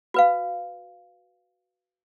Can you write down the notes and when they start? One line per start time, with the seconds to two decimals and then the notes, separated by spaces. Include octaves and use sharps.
0.14 F#4 B4 F5